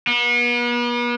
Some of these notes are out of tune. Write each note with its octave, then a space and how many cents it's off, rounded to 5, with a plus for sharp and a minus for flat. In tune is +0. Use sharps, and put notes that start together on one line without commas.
B3 -40